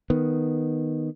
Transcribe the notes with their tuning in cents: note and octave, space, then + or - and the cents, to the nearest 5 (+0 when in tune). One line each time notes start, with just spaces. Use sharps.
D#3 +0 B3 +0